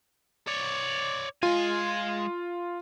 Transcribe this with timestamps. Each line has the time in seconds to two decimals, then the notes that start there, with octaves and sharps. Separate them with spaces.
0.47 C#5 D5
1.43 G#3 F4 G#5